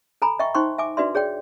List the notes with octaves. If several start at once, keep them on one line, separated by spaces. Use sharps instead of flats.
A4 G#5 A#5 B5
D#5 E5 G5 C#6
D#4 C5 G5 C6 C#6
E5 G#5 D6
D4 F#4 B4 D5 E5 C6
G#4 C#5 D5 G5